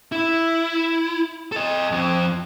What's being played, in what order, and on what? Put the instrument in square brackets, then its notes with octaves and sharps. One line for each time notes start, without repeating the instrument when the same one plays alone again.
[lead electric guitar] E4
A4 D#5
F2 C4